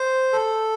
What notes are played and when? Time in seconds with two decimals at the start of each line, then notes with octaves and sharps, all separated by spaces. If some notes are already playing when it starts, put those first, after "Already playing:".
Already playing: C5
0.33 A4